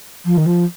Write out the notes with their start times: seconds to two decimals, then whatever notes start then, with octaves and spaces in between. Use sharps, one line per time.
0.25 F3
0.37 D#3
0.46 F3